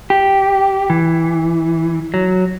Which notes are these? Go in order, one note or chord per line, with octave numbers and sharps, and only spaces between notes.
G4
E3
F#3